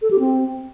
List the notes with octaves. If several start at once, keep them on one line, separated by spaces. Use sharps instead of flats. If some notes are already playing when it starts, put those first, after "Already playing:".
A4
G4
C4